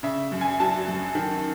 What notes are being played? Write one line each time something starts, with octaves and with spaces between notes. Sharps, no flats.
C#3 E5
F#2
G#5
F#3 A5
F#2
D#3